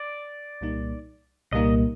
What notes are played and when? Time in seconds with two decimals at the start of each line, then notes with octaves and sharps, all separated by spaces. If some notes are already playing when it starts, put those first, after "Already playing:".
Already playing: D5
0.61 C2 A#2 G3 A#3 D#4
1.52 C2 A#2 G3 A#3 D#4 D#5